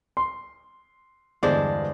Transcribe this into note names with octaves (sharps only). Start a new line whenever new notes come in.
C6
E2 G2 D3 G#3 D4 C5